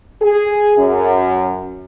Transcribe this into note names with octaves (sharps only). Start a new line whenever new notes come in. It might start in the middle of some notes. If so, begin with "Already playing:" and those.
G#4
F#2